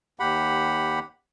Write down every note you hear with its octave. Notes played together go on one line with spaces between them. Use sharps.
D#2 G4 F#5 B5